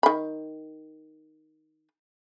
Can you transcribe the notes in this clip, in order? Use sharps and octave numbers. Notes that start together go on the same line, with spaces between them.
D#3 B5